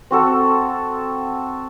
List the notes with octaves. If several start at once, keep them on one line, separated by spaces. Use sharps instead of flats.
C4 F#4 A4